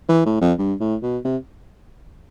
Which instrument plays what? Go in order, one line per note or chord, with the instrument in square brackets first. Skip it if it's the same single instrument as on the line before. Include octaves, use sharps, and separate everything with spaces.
[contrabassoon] E3
A2
F2
G2
A2
B2
C3